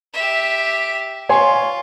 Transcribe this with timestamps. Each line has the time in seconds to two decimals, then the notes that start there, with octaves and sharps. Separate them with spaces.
0.13 G4 E5
1.29 F4 C#5 G#5 C6